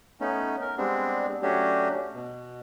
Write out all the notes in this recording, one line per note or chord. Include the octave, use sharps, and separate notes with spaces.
A3 B3 C#4 D#4
A#4
G3 G#3 B3 C4 D4
F#3 A3 C#4 D4 F#4 G4
B2